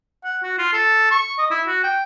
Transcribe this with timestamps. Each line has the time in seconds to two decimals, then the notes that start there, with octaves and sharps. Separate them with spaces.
0.24 F#5
0.43 F#4
0.58 F4
0.73 A4
1.11 C#6
1.39 D#5
1.51 E4
1.67 F#4
1.84 G5